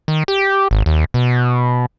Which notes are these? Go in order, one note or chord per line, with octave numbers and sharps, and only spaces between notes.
D#3
G4
G#1
D#2
B2